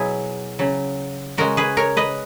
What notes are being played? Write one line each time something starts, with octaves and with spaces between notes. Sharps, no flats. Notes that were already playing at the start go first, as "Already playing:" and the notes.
Already playing: B2 F#3 E4 G#4
C#3 F#3
C#3 G#3 F#4 A#4
G#4 B4
A#4 C#5
B4 D#5